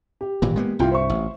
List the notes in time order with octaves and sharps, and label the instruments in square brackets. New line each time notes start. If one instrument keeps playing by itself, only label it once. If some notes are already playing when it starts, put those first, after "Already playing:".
[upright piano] G4
[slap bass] G#1 A#2 E3
G#3 A#3 B3
[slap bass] C2 G2 [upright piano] E4 F4 G5
[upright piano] C5 E5 C#6
[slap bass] A1